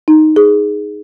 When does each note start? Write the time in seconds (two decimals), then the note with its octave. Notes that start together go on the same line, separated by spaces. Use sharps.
0.08 D#4
0.36 G#4